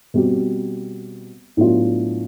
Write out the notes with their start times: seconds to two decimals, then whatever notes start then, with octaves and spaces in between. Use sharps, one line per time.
0.14 B2 G3 C4
1.57 A2 F#3 B3 D4 F4